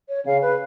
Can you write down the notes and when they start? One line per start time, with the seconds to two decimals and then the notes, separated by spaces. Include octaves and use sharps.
0.09 C#5
0.26 C#3 F5
0.42 B4